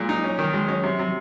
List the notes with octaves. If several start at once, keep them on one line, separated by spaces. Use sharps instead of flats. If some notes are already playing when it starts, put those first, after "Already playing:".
Already playing: A#2 F#3 G#3
D#4
C#4
D#3
F#3 G#3
C#4
C3
C3